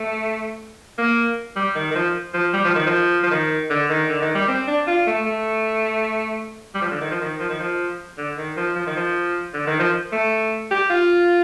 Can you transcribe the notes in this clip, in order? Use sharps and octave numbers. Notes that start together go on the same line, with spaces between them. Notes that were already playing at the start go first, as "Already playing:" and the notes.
Already playing: A3
A#3
G3
D#3
D#3
F3
F3
G3
F3
D#3
F3
F3
D#3
D3
D#3
D3
D#3
G3
C4
D4
F4
A3
A3
G3
F3
D3
D#3
F3
D#3
F3
D#3
F3
D3
D#3
F3
F3
D#3
F3
D3
D#3
F3
A3
G4
F4